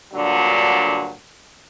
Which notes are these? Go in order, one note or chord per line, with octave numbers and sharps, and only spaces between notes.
G2 A#2 D3 F#3